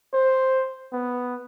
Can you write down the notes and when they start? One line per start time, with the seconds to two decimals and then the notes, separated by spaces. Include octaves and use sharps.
0.14 C5
0.93 B3